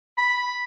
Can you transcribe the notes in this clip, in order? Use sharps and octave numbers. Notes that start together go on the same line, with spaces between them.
B5